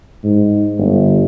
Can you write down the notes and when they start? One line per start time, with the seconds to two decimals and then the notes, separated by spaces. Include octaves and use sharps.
0.24 G#2
0.78 G1